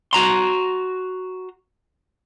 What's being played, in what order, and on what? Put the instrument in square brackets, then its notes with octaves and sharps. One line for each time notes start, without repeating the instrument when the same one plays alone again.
[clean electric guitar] F#4 A#5 C6